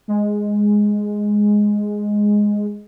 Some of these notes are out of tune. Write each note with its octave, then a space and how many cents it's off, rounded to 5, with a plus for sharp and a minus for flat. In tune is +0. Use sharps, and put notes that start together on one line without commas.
G#3 +0